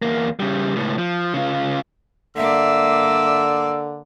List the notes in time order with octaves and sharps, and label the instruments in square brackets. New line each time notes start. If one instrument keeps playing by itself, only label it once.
[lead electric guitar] E2 A#3
C#3 G3
C#2 A2
F3
C#3 F4
[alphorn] D3 [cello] A#3 D5 [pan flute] E5 [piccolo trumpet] E6